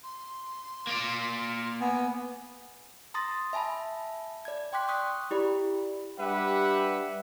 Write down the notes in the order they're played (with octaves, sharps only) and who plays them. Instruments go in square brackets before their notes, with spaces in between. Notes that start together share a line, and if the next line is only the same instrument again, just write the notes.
[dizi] C6
[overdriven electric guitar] A#3 D5
[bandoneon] B3 [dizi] G#5
[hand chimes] A#5 C6 D#6 A6 A#6
E5 G#5 A5 B5
D5 G#6
G5 C6 D6 F#6 B6
C#6 D#6 F#6 B6
E4 G4 D5 B5
[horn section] G3 D4 G4 B4 E5 F#5